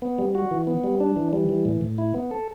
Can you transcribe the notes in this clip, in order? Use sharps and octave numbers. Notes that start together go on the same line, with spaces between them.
B3
G3
F#4
E3
B3
G3
D4
E3
G3
E3
A2
A2
E4
B3
A4